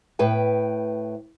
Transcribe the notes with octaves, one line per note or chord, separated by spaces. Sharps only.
A2 B4 G5